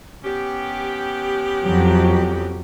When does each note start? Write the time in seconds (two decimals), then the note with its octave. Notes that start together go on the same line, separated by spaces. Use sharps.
0.24 B3 C#4 G4
1.63 F2 F#3